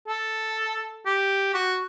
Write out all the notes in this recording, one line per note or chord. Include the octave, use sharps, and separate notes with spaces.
A4
G4
F#4